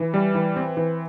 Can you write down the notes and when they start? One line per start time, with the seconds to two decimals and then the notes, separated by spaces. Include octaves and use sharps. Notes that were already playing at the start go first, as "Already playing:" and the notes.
Already playing: E3
0.14 G3
0.35 E3
0.56 C4
0.77 E3